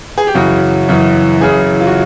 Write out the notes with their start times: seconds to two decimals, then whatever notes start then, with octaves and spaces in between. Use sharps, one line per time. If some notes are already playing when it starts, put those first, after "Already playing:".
0.18 G#4
0.27 G4
0.35 F#2 C#3 E3 F#4
0.89 F#2 C#3 E3
1.41 F#2 C#3 E3 G#4
1.80 F4
1.87 F#4